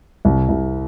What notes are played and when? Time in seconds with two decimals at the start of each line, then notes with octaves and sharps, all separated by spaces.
0.25 C2
0.49 C2